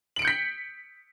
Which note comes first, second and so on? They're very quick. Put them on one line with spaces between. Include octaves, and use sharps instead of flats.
F#7 D7 C#7 G6 B6